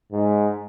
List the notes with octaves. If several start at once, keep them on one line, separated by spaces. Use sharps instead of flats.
G#2